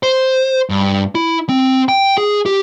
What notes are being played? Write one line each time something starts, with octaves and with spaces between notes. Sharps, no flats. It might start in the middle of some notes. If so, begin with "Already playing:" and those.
C5
G2
E4
C4
G5
G#4
G4